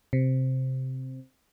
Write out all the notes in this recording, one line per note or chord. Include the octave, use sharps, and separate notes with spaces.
C3